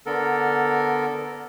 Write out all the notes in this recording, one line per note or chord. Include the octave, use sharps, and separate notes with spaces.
D3 B3 A4 A#4